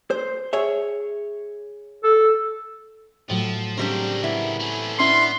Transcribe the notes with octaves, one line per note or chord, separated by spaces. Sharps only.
C5
G#4 C#5 E5
A4
A2 F3 F#3
C#3 F#3 G3 C4 D4 A#4 B6
B3 E4
A3 C#4
B3 C#4 D4 E4 C6